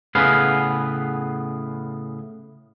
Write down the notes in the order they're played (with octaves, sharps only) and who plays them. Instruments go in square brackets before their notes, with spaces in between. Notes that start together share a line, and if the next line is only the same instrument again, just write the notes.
[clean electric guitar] A2 C#3 B3 G#4 B4 F5